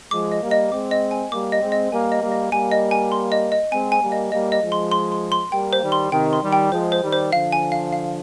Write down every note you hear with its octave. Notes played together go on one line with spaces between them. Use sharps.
F3 G#3 D6
D#5
G3 A#3
D#5
G#3 C4 D6
D#5
G#5
G3 A#3 D6
D#5
G#3 C4
D#5
G3 A#3 G#5
D#5
G3 A#3
D#5
G3 A#3 G#5
D#5
G#5
C6
D#5
D#5
G#3 C4 G#5
G#5
G3 A#3
D#5
G3 A#3 D#5
D#5
F3 G#3
C6
C6
C6
C6
G3 A#3 G5
C5
D#3 G3
C6
C3 D#3 G5
C6
D#3 G3
G5
F3 G#3 C5
C5
D#3 G3
C5
D3 F3 F5
G#5
F5
F5